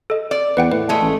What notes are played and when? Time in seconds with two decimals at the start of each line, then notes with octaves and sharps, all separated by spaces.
0.10 A4 D#5
0.31 D5
0.57 E2 B4 F#5 G5
0.72 A2 B4
0.89 G#3 A3
1.02 A1